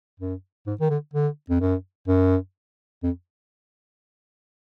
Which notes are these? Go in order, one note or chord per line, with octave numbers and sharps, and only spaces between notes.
F#2
G#2
D#3
D3
D3
F2
F#2
F#2
F2